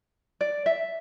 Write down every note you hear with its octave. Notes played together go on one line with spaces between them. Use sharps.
D5
E5